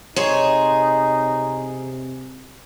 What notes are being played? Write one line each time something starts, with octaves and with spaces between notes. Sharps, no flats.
C3 D#4 G#4 C5 C#5